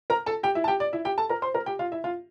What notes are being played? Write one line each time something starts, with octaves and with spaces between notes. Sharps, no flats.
A#4 A#5
A4 A5
G4 G5
E4 E5
A5
G4 G5
D5
E4 E5
G4 G5
A4 A5
A#4 A#5
C5 C6
A#4 A#5
G4 G5
F4 F5
E4 E5
F4 F5